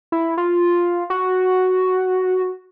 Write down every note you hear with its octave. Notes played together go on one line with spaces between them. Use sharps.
E4
F4
F#4